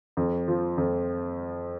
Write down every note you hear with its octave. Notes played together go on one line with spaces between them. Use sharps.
F2
F3
F2